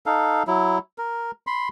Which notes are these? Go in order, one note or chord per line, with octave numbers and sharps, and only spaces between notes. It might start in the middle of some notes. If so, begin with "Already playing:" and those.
D#4 A4 F5
F#3 E4
A#4
B5 C6